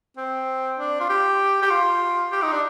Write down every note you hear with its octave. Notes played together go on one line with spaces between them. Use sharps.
C4
D4
F4
G4
G4
F4
G4
D#4
D4